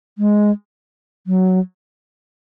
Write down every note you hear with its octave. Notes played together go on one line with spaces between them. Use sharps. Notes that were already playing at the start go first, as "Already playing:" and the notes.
G#3
F#3